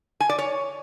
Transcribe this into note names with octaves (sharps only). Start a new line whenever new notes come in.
G#5
D5
C#5